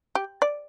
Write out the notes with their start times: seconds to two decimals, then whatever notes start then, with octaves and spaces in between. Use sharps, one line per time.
0.15 G4
0.42 D5